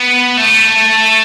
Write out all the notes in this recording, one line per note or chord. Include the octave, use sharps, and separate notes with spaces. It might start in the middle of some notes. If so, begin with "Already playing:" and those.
Already playing: B3
A3